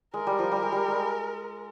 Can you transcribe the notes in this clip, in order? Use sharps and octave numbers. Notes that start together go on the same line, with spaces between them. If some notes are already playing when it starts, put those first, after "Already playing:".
G#3 A#4
G3
F3
G3
G#3
G3
G#3